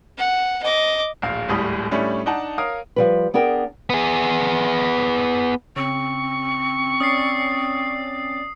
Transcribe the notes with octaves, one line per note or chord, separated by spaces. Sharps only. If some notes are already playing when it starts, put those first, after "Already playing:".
F#5
D#5 D6
D1 A#1 F5
D1 G#1 D#2 A2 G3 D#6
A2 G3 A3 C#4 D4
D4 D#4 F#5 A5
A#4 C#5 F5 D#6
F3 G3 B4
B3 D4 G#4 A#4 G5
B3 G#4
C#3 C4 C#6
C#4 D5 D#6 A6 C7